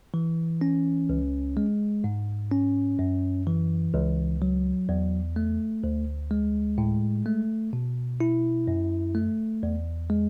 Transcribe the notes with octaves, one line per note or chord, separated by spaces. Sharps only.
E3
C#4
C#2
G#3
G#2
C#4
F#2
E3
C#2
F#3
E2
A3
D2
G#3
A2
A3
B2
E4
F#2
A3
E2
G#3